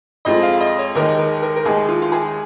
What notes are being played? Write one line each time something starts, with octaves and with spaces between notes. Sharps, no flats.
F2 F3 G#3 D#5
F5
D#5
C#5
D#2 D#3 G#3 D#4 A#4
A#4
A#4
A#4
D#2 D#3 G#3 D#4 G#4
F4
F4
G#4